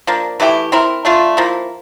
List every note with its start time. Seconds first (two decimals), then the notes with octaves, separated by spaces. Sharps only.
0.07 F3 A#3 D4
0.40 E3 A3 E4 G4
0.72 C4 E4 A#4
1.05 A3 D4 F4
1.37 F3 A#3 E4